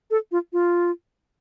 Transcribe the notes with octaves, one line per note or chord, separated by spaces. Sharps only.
A4
F4
F4